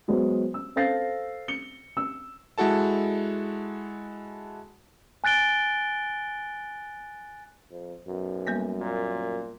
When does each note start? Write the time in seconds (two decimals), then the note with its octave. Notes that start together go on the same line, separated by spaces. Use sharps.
0.08 F#3 G#3 B3 G#4 C5
0.54 E6
0.76 A4 C5 F5 A6 A#6 C7
1.48 C#7 G7
1.97 E6
2.58 G#3 E4 F#4 A4 A5
5.24 G#5 F#6 A6 D7 G7
7.70 F2
8.07 B1 F#2
8.47 G3 A#3 B3
8.80 A#2